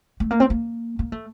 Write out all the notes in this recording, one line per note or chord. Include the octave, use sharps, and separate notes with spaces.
A3
A#3
C4
A#3
A#3
A3